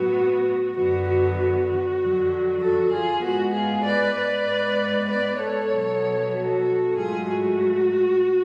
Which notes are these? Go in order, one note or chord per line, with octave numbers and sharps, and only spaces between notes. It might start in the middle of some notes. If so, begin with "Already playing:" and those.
Already playing: A2 F#3 B3 F#4
F#2 D3 F#3 B3 F#4
F#4
F#4
F2 D3 F#3
F#4 A4
F4 G#4
G#2 G#3 B3 F#4
F4 G#4
B4 D5
B4 D5
G#2 G#3 B3
B4 D5
A4 C#5
B2 F#3 B3
F#4 A4
G#2 F#3 A3 F4 G#4
F#4